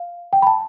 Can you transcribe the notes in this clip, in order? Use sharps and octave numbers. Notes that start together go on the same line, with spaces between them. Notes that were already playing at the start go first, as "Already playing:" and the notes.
Already playing: F5
G5
B5
A5